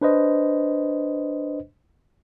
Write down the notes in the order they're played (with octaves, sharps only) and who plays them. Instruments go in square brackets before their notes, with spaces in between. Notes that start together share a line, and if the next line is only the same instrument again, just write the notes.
[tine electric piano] D4 B4 C5 D#5